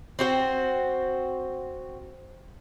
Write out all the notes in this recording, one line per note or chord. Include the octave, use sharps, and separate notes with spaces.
C4 F#4 C5